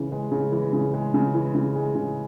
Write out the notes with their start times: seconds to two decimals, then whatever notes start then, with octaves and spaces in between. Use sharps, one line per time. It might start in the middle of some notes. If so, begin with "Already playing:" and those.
Already playing: C#3 E3
0.12 G#3
0.32 C#3
0.52 E3
0.73 C#3
0.94 G#3
1.14 C#3
1.34 E3
1.55 C#3
1.75 G#3
1.95 C#3